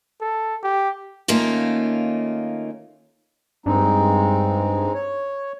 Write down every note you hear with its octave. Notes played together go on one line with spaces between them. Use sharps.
A4
G4
D#3 A3 A#3 C#4 D#4 F4
G2 G#3 C4 D#4
C#5